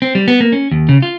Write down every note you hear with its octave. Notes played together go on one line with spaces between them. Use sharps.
C4
G3
B3
A#3
C#4
D#2
C#3
F4